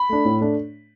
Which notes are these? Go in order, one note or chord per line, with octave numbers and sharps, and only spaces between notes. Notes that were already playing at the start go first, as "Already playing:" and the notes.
Already playing: B5
A3 D4
A2
A3 D4